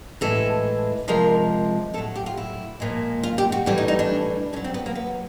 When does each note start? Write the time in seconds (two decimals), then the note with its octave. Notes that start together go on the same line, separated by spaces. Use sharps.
0.21 A2 E3 G#3 A4
1.08 C3 F3 G#3 A#4
1.94 A2 A4
1.98 F#3
2.16 G4
2.26 F4
2.37 E4
2.80 A#2 F3 G#3
3.23 F4
3.38 G4
3.52 F#4
3.66 A2 E3 G3 E4
3.78 D#4
3.88 D#4
3.99 D4
4.53 D3 C#4
4.56 F#3
4.64 C4
4.74 B3
4.86 A#3
4.96 B3